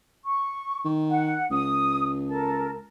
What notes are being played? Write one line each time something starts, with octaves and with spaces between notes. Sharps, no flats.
C#6
D#3
F#5
C#2 D#6
A4 A#4 A5